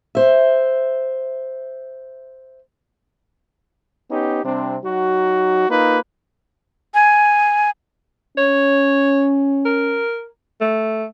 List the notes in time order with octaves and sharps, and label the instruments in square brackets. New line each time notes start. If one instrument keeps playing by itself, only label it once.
[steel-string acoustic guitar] C5 E5
[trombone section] B3 C#4 D#4 G4
C3 G3 C4 D4
F#3 D#4 F#4
A#3 D#4 F4 B4
[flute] G#5
[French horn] C#4 [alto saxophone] C#5
[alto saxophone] A#4
A3